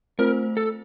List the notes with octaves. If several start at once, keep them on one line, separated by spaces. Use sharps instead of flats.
A3 C4 F4 A#4 C5
A4